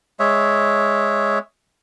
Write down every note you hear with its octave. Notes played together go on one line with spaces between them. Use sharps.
G#3 C#5 E5